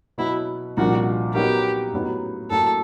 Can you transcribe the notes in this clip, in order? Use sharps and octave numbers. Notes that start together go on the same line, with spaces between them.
B2 F#3 B3 E4
C2 A#2 F3 A#3 D4 F#4
F#3 B3 D#4 F#4 G4 A#4
A2 F#3 B3 D#4
A2 F#3 A#3 A4